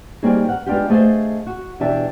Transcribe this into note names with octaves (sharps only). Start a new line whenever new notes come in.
G3 A#3 C4 D#4 F#4 G#4
A#4 F#5
G#3 B3 D4 F4 G4
A3 G#4 C5 D#5 F5 A5
F#4
B2 E3 D4 G4 E5 A5